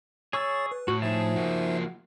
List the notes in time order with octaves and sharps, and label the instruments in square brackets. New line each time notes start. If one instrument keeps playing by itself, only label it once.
[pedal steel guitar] G#4 C#6 E6 [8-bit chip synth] C#5 A6
[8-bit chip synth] B4
[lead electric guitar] A2 [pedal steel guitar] F#4
[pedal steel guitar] F3 G#4 A5 [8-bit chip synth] D#4 C5 E5
[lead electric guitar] A#3 F#4